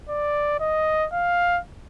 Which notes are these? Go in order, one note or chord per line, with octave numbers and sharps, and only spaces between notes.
D5
D#5
F5